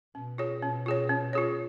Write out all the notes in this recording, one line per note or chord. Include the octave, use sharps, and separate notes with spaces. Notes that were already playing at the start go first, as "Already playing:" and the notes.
B2 C#4
F4 G#4 C#5
B2 C#4
F4 G#4 C#5
C#4
F4 G#4 C#5